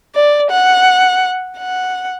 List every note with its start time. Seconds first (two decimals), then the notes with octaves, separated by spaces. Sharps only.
0.15 D5
0.51 F#5
1.58 F#5